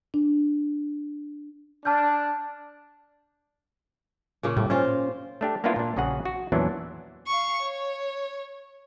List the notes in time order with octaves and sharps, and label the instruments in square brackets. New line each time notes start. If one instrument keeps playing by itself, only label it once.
[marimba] D4
[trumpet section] D4 [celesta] A5 F6 G6
[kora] A#2 C#3 A#3
[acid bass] A2 [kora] G3
[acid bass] C#4 [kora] F4 A#4 C5
[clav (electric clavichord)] A3 D4 G4
A#3 B3 D4 E4 F4
A#2 D4
A#1 C#3 F#4 G#4 F#5
F#4
E2 A#2 E3 F#3 C#4 D4
[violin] F5 C#6
C#5